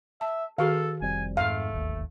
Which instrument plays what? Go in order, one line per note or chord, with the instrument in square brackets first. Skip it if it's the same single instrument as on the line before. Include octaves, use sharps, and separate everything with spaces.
[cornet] E5 [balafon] A5
[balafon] D#3 F#4 G#4 [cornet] A4 [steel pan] F5
[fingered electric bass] F1 G3 C4 [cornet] G#5
[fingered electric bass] F2 G#2 [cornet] A3 [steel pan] F5
[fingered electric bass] D1 G#1 D#2